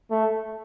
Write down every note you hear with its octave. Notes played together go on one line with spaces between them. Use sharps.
A3